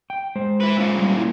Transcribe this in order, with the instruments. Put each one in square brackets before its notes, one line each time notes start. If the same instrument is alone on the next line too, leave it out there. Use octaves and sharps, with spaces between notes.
[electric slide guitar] G5
G#3 C5
[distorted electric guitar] E4 B4
A#2 C#4
[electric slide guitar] G3
E4